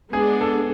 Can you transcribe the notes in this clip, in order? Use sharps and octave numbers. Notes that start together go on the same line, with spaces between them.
G#3 B3 D4 G#4
A4